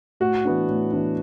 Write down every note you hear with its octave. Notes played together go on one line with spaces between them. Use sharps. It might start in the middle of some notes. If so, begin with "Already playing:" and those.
A2 F#4
E3 B3 D4
A2
E3 B3 D4